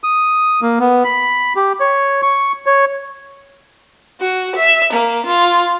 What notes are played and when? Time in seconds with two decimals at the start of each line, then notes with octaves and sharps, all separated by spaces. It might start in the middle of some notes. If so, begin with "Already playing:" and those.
0.04 D#6
0.62 A#3
0.80 B3
1.04 B5
1.56 G4
1.80 C#5
2.22 C#6
2.66 C#5
4.21 F#4
4.56 E5
4.93 A#3
5.26 F4